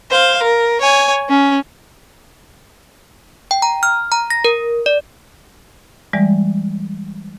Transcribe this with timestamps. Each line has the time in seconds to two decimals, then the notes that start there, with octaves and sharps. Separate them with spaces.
0.11 C5 F5
0.42 A#4
0.81 C#5 G#5
1.29 C#4
3.51 G5
3.62 A#5
3.83 F6
4.12 A#5
4.30 A#6
4.45 A#4
4.86 D5
6.13 E3 G3 G#3 D5